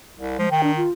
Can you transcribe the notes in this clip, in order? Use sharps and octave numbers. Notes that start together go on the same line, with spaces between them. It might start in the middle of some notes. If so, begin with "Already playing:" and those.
C2
F3 G#3
D#3 G5
D4
F4